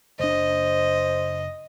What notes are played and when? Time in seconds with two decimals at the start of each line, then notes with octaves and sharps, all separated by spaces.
0.20 F#1 D4 C5 D#5